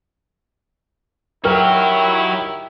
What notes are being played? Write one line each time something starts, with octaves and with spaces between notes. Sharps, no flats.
D#3 F#3 E4 F#4 G4 A#4 G5 F6